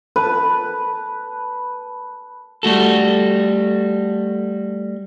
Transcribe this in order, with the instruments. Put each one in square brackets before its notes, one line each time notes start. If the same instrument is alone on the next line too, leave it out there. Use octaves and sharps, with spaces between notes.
[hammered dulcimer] B4 A5
[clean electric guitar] G3 A3 F#4 A4